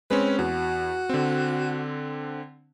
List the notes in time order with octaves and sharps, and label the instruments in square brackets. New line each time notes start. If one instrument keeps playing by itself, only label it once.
[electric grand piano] G#3 C4 C#4 [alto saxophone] B4
[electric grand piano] E2 [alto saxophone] F#4
[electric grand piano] D3 C4